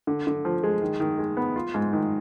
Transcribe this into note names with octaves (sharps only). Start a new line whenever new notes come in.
D3
D3
F3
G#3
D#3
D#3
G#3
B3
F4
G#2
D#3